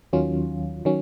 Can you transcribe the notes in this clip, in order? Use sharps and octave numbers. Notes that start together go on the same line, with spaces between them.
D#2 D#3 F#3 C#4 F4
D#3 F#3 C#4